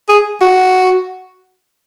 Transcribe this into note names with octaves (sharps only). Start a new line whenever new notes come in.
G#4
F#4